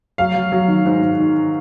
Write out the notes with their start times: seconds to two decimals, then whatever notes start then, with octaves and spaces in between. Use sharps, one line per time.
0.18 F#3 F5
0.35 F#3
0.52 F#3
0.68 D#3
0.85 G#2
1.02 G#2
1.19 D#3